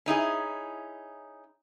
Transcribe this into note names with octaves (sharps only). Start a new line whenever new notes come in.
C#4 D#4 E4 G#4